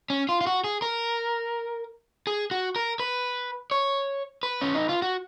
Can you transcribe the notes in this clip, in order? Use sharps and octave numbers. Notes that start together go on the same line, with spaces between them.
C#4
F4
F4
F#4
G#4
A#4
G#4
F#4
A#4
B4
C#5
B4
C#4
D#4
F4
F#4